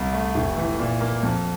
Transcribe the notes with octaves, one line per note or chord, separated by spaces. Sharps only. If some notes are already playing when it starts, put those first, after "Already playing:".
Already playing: C2
A3
F1
E3
A#2
A#3
F2